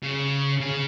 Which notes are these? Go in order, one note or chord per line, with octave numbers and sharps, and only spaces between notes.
C#3
C#3